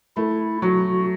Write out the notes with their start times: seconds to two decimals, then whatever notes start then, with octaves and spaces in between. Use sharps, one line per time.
0.17 A3 E4
0.62 F#3 F#4